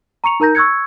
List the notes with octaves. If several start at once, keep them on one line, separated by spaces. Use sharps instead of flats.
A#5 C#6 C#7 F7
D#4 A#4 A#5 G6 A#6
C#6 E6 F#6 G#6 C#7